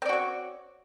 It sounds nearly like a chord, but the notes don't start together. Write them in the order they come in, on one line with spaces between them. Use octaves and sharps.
C4 D5 F#4 C#5